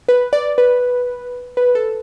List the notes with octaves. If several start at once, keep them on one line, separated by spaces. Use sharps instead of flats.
B4
D5
B4
B4
A4